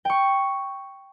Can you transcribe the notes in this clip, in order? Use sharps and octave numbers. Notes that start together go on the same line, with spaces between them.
G5 C#6